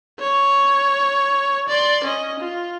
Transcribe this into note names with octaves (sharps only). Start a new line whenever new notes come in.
C#5
D5 C6
C#4 D#5
F4